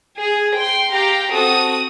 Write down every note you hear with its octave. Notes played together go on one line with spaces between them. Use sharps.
G#4
G5 C6
G4 F5 G5 A#5
C4 F#4 A4 D#6